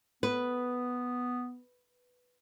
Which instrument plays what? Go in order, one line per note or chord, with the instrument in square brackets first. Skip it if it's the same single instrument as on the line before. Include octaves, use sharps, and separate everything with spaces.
[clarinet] B3 [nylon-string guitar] B4